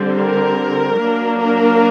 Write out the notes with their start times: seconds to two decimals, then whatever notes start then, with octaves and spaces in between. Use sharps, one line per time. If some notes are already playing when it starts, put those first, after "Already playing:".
Already playing: D3 G3 C4
0.14 A#4
0.99 F#3 A#3 D4
1.41 A#4